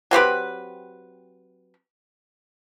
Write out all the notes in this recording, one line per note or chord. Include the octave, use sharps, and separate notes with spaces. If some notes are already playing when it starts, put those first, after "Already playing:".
F#3 C4 G4 B4